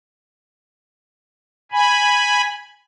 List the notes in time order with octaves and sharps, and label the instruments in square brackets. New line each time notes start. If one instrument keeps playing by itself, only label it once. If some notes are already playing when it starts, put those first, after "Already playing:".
[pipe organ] G#5 B5